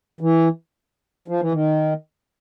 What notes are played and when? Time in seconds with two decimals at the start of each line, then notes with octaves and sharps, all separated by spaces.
0.21 E3
1.28 F3
1.40 E3
1.52 D#3